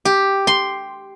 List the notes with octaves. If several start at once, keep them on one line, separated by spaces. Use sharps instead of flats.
G4
C6